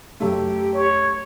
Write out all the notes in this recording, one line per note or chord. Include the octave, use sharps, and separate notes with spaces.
F#2 A3 G4
C#5